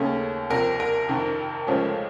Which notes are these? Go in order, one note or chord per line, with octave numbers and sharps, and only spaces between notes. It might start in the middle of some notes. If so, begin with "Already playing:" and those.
Already playing: D#2 C#3 A3 C#4
C2 C3 F3 C4 A#4
A#4
F2 C3 D#3
C#2 C#3 F3 A3 C#4